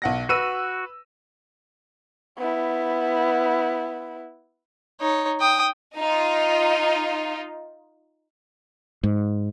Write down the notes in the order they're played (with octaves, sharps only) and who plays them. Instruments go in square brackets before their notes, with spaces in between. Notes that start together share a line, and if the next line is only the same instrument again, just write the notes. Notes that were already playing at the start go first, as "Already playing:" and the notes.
[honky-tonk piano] B1 F#5 A#6
[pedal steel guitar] F#4 [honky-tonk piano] B4 E6 D#7
[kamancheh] B3 E4
[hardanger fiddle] D#4 C#5
G5 D#6
[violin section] D#4 F4
[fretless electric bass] G#2